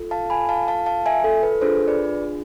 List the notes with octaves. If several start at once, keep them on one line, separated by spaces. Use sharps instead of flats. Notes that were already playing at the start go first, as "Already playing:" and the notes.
Already playing: F4 A4
F5 A5
G#5 B5
F5 A5
F5 A5
F5 A5
E5 G#5
A4
B4
D4 F4 G#4 A4 C5
B4 D5